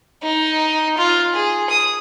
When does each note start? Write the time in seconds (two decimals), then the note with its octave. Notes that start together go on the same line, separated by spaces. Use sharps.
0.22 D#4
0.97 F4
1.33 G#4
1.69 D#6